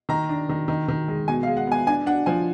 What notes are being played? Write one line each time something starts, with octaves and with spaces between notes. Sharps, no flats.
D#3 A#5
D4
D#3
D#3
D#3
G#3
B2 G#5
F5
G#3
F#5
B3 G#5
D4 G#5
D4 F#5
F3 G#5